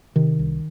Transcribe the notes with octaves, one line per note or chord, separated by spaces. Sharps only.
C3 D#3
C2